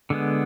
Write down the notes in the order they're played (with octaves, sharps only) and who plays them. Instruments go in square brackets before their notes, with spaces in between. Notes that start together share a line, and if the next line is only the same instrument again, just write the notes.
[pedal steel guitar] D3 G#3 B3